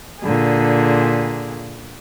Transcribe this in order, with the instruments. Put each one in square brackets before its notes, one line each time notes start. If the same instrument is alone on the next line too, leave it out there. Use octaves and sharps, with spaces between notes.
[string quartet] A#2 D3 G#4